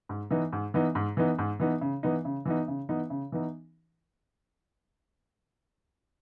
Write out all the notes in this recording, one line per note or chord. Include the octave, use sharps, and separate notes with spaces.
G#2
E3 B3 D#4
G#2
E3 B3 D#4
G#2
E3 B3 D#4
G#2
E3 B3 D#4
C#3
E3 B3 D#4
C#3
E3 B3 D#4
C#3
E3 B3 D#4
C#3
E3 B3 D#4